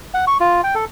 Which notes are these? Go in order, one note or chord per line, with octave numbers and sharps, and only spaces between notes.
F#5
C#6
F4
G5
A4